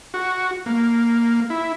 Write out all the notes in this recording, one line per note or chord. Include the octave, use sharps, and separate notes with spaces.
F#4
A#3
E4